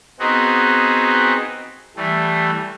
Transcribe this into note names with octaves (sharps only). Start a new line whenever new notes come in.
B3 C4 D#4 F#4 G#4
E3 G3 A3